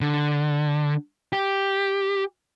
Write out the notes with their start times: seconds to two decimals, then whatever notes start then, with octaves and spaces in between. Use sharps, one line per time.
0.01 D3
1.33 G4